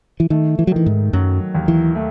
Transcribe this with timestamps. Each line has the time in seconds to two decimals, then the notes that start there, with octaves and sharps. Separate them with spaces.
0.20 E3
0.30 D#3 A3
0.59 E3
0.67 F#3
0.72 D#3 E3
0.86 G#2
1.13 F#2 F#3
1.55 D#2
1.68 E3
1.95 A3